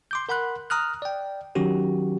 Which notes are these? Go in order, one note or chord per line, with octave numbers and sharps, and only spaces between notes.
C6 D6 G6
A#4 F#5 B5 C6 F#6
A#5 D#6 F6 F#6
D5 G5
D#3 F#3 C#4 F#4 G4